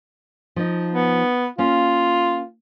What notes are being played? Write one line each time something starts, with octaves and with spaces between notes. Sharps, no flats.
F3 D#4
B3
A#3 C#4 F4